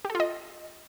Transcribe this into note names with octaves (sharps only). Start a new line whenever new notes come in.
G4
A4
F4
D#5